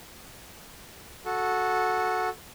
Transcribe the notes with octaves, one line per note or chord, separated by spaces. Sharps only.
F#4 A4